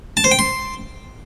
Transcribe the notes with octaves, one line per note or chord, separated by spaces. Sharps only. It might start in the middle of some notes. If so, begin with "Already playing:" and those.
A5
C5
G5
C6